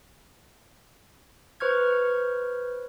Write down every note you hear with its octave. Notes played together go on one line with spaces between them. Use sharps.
B4 C5 C#6 F6 G#6